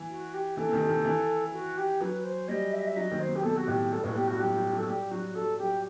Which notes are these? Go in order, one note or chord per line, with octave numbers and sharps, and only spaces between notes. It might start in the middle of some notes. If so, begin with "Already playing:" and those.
Already playing: E3
F#4
G4
E3 A4
C3
D#3
D#3
E3
F#4
G4
F#3 B4
C5
G3 D#5
E5
D#5
E5
F#3 D#5
D#3
C5
C3
G4
B2 A4
F#4
A2 G4
G2 A4
A2 B4
F#4
B2 G4
G2 F#4
F#3 G4
F#3
F#3
A4
G3 G4
F#3 F#4
F#3 A4
F#3 G4